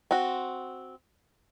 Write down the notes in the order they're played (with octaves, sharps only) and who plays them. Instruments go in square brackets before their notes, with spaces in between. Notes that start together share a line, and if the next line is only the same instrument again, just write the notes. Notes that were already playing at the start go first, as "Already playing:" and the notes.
[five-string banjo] C4 F#4